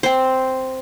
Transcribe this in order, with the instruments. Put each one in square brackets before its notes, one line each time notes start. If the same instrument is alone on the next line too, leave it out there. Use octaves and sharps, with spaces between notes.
[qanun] C4 C5